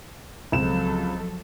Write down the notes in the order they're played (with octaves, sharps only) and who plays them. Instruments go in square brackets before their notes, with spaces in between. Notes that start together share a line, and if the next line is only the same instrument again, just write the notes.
[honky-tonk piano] C#2 C4 E7 [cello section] F3 F#3 A4